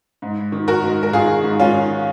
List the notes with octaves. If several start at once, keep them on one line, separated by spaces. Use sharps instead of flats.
G#2
D#3
F#4 A#4
G#2
A#4
D#3 F4 G#4
G#2
C#4 F4
D#3